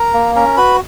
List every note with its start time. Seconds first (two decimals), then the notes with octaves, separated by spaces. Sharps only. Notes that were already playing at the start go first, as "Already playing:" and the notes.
Already playing: A#4 A#5
0.14 A#3
0.35 C#4 A#4 A#5
0.57 F#4 B4 B5